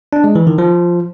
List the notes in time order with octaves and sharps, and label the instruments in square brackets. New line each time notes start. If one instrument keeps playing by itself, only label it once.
[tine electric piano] D4
G#3
E3
D#3
F3